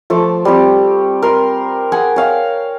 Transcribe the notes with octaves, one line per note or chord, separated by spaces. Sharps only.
F3 A3 D6
G3 C4 G4
A#4 C6
G#4 F#5 G#5
C#5 F5 G5